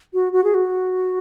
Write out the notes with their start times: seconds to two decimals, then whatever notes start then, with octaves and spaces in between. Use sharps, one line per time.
0.14 F#4
0.33 F#4
0.44 G#4
0.54 F#4